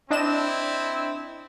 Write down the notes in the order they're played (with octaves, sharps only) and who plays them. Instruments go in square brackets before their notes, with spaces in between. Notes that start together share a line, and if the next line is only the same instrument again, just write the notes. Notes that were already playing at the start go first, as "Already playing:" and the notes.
[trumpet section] C4 E4 [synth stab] D4 D#5 E7